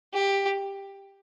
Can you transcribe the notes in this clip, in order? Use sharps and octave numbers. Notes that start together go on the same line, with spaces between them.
G4